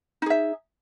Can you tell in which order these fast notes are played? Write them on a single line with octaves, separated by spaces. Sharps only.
D#4 G#4 E5